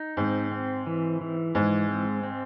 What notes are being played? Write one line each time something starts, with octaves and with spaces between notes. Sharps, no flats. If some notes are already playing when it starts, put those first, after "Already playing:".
Already playing: D#4
G#2 C4
C4
E3
E3
G#2 G#3
C4
C4